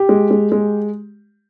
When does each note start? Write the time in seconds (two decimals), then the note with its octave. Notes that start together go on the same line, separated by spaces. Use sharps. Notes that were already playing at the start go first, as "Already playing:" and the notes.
Already playing: G4
0.09 G#3
0.31 G#3
0.52 G#3